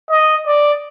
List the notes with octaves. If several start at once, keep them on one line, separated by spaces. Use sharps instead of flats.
D#5
D5